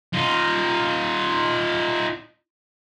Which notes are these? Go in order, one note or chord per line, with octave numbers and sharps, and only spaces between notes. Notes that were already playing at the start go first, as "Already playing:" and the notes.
D#4 F4